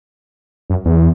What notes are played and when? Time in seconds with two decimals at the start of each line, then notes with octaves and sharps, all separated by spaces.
0.70 F#2
0.85 E2